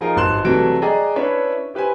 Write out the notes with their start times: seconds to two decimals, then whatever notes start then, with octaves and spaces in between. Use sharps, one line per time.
0.01 F3 D#4 F4 G#4 A#4
0.16 G#1 G2 C5 C6 F#6 E7
0.44 C3 E3 F#3 G3 A3 D7
0.82 G#4 D5 D#5 G5 A#5
1.16 C#4 D4 E4 B4 C#5 E5
1.74 E4 G4 B4 C5 G#5